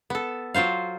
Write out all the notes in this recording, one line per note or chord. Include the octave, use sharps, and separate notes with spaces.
B3 A4
F#3 F4 C5 F5